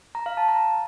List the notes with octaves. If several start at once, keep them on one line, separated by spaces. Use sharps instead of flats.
A#5
F5
A5
A#5